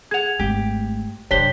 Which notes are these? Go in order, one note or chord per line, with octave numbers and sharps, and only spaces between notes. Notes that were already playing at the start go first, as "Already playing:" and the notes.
G#4 F#5 G#6 F7
G#1 A3 G4
F#2 C3 D4 G4 C5 C#5 B6 G7